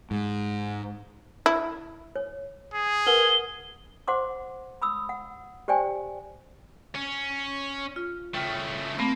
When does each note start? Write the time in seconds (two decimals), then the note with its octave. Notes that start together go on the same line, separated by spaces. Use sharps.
0.11 G#2
1.46 E4
2.16 C#5
2.74 G#4
3.07 A#4 B4 F#5 G7
4.08 C5 F#5 C6 D6
4.82 B5 D#6 E6
5.09 F#5
5.68 G4 C5 D5 G5 G#5
6.95 C#4
7.96 F4
8.34 C#3 A3 G5 F6
8.98 A3 A#3 C4 B5